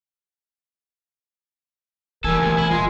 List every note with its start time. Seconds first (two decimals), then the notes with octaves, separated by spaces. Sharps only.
2.24 E3 G3 A4 A#4 G#5
2.38 D2 C3
2.58 E4
2.71 D#1 G#3 F4